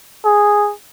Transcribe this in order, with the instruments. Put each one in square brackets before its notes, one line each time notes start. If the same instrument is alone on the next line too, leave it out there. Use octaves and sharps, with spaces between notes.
[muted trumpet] G#4